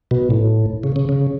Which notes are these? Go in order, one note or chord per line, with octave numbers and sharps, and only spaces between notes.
B2
A2
C#3
C#3
C#3